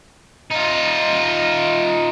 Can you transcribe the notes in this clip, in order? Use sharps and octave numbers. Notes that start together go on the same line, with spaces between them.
D#4 F4